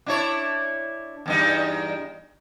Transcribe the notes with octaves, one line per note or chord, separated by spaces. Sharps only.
D4 E4 C#5
E2 G2 D#4